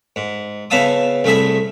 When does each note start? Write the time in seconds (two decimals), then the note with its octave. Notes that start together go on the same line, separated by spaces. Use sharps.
0.16 G#2
0.70 C#3 B3 E5 F5 A5 D#6
1.24 C2 A3 G#4 E5 B5